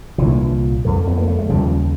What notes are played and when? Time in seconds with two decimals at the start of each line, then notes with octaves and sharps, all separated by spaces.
0.18 C2 A#2 D3 E3
0.85 F2 D3
1.07 B3
1.17 A#3
1.28 A3
1.39 G#3
1.49 D#2 C#3 F3 G3